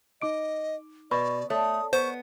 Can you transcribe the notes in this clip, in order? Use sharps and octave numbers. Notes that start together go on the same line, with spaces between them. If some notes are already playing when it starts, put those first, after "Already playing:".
D#4 D#5 D6 D7
B2 B4 D5 B5 C#6
A3 C#5 D5 D#6
B3 C5 C#6